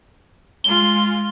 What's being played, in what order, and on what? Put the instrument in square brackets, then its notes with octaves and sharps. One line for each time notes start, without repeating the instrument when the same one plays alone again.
[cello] G#3 F4 [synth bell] G7